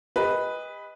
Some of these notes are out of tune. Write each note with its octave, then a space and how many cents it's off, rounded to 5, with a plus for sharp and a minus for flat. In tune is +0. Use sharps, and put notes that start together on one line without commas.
G4 +45 B4 +0 D#5 +10